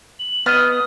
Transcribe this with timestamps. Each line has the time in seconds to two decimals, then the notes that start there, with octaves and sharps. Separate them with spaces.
0.19 F#7
0.46 B3 D#5 D#6 F6